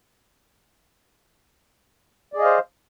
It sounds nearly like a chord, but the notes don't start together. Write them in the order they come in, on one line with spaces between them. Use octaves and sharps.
D5 G#4 D#5 F5 C5